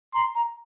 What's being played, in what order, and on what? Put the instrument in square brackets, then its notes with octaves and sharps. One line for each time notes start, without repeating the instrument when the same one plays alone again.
[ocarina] A#5 [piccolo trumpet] C6
[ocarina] A#5